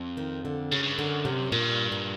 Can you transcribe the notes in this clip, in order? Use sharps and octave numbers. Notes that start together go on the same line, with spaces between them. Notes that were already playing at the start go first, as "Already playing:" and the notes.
Already playing: F2
D#3
D3
F#2 C#3
G2
F#2
D3
C3
G2 A#2
A#2